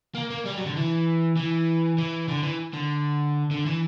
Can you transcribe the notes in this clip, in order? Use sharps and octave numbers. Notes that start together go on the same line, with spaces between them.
A#3
A#3
G3
F#3
D3
E3
E3
E3
D3
E3
D3
D3
E3